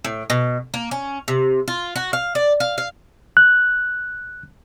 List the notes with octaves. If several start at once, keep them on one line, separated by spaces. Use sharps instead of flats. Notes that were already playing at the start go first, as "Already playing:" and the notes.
A2
B2
A#3
C#4
C3
F4
F#4
F5
D5
F5
F5
F#6